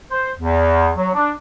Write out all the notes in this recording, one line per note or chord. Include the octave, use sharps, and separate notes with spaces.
C5
E2
F#3
D4